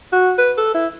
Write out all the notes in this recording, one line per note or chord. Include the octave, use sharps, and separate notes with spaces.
F#4
B4
A4
E4